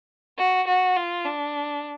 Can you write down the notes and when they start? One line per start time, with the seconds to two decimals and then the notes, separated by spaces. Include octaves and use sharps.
0.38 F#4
0.67 F#4
0.96 F4
1.25 D4